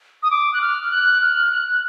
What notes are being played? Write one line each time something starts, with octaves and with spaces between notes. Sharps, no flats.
D#6
D6
F#6
F6
F#6
F6
F#6